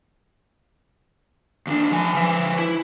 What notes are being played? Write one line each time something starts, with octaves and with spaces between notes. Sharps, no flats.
D#2 D4
F3 G#5
F3 B4
E4